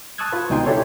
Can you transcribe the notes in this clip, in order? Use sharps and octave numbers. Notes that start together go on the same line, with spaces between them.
A5 C#6 D#6 E6 F#6 G#6
F4 B4
C#2 B2 D#4 G5 G#5 C6
D4 E4 G4 A4 C#5